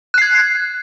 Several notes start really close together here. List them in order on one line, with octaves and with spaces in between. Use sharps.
F#6 C7 G#6